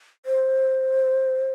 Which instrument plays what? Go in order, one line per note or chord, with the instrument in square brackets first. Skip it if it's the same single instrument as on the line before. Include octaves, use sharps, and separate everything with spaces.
[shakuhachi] C5